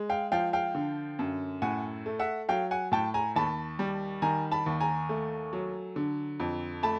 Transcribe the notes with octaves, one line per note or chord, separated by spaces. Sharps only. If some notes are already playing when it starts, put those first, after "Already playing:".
Already playing: G#3
F5 G5
F3 F5 G5
F5 G5
D3
F#2
A2 F#5 G#5
A3
E5 F#5
F#3 F5 G5
F#5 G#5
A2 G5 A5
G#5 A#5
D#2 A5 B5
G3
D#3 G#5 A#5
A5 B5
D#2
G#5 A#5
A3
F#3
D3
F2
A3 A5 B5